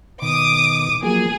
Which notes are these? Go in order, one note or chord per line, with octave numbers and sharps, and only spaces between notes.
B2 D#3 D6 D#6
F3 F#3 A#3 G#4